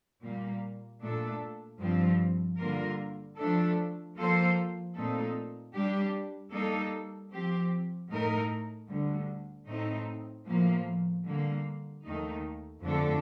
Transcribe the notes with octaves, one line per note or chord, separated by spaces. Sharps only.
A#2 G3 A#3
A#2 A3 D4 A4
G2 F3 C4
D3 G3 A#3 F4 A#4
F3 A3 D4 A4
F3 A#3 F4 A4 C5
A#2 A3 C4 D#4 A4
G3 D4 G4
G3 A#3 D#4 A4
F3 C4 G4
A2 A3 D#4 A#4
D2 D3 G3
A2 A3 C4 D#4
A2 F3 A#3
D3 G3 A#3
D#2 D#3 A3 D#4
F2 D3 A3 D4 A4